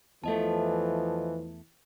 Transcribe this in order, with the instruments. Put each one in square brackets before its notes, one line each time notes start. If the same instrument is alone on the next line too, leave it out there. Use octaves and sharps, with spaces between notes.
[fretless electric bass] E2 A3 [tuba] E3 [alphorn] F3 [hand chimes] A4 D#5 A5